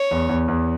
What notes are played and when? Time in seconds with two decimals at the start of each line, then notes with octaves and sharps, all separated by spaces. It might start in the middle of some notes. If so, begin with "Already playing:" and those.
Already playing: C#5
0.11 E2
0.29 E2
0.48 E2